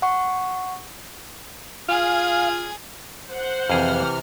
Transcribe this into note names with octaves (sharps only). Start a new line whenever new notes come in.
F#5 C#6
F4 G#4 F5 G#5
C5 F#5
F2 C3 E3 G#4 F6